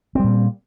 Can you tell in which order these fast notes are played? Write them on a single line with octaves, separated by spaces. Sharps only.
C4 G3 A#2